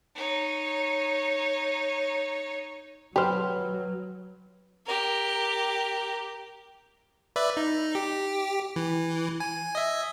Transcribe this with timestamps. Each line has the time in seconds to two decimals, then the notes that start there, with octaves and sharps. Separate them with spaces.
0.15 D#4 C#5
3.16 F#3 G4 B4 C5 F6
4.86 G4 A#4
7.36 B4 D5 E5
7.57 D#4
7.95 G4
8.76 E3
9.40 G#5
9.75 D#5 E5